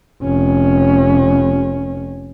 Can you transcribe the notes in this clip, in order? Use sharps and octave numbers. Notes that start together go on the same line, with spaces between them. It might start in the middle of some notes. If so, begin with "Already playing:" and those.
F1 C#4